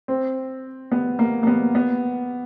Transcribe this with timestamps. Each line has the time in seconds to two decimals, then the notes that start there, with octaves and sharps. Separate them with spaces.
0.08 C4
0.92 B3
1.19 A#3
1.43 A#3
1.47 B3
1.75 B3